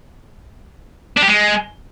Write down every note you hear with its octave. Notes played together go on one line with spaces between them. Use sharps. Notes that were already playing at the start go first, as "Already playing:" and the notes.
D4
G4
G#3